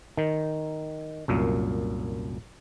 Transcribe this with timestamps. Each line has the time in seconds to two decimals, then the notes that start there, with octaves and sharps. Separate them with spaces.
0.17 D#3
1.28 C2 F#2 A#2